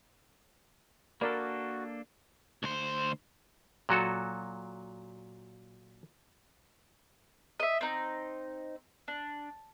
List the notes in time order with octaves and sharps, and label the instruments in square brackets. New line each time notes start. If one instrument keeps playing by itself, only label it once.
[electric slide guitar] A#3 D4 A4 [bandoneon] F#4 [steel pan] A#4 D5 B5
[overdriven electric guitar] D2 C5
[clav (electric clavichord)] A#2 F#3 F#4 A4
[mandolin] D#5 E5
C4 D#4
D4